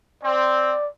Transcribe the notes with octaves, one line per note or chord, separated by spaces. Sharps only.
C4 D5